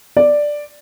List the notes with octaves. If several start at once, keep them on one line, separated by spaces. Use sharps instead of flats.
D5